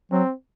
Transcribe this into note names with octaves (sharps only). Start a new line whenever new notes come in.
F#3 C4